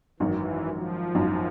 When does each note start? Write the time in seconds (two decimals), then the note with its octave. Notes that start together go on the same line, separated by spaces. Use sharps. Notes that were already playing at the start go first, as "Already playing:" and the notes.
0.20 G#1 F#2 D#3 E3
0.68 F3
1.15 G#1 F#2 D#3